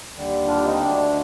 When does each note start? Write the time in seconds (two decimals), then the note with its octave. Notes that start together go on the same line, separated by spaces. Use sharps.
0.13 D#2 D3 G3
0.47 D4 F4
0.64 C4 D#4
0.81 D2 D3 A3 D4